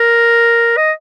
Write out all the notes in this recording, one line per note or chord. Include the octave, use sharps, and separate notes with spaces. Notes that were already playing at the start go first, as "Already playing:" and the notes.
Already playing: A#4
D#5